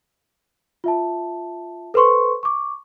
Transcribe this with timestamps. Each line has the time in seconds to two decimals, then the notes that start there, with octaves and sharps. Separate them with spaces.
0.84 F4 E5 A5
1.94 A4 B4 C5 C6 C#6
2.43 C#6 D6